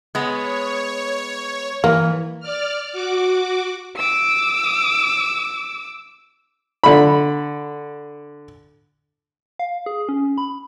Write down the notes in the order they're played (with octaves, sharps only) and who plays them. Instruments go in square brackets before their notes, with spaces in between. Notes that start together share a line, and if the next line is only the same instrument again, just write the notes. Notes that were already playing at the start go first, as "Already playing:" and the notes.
[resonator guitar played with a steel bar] G#3 B3 [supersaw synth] C#5
[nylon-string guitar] E3 [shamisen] A#3
[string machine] D5 F6
F#4 D6
[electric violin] D6 E6
[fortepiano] D3 B5
[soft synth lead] F5
G#4
C#4
B5